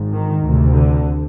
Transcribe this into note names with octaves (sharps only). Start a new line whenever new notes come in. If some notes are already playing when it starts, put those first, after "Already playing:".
Already playing: G#1 G#2
D#3
D2 C3
D3